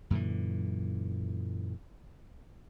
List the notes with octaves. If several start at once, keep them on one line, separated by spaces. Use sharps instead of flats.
F#2 A#2 D3 E3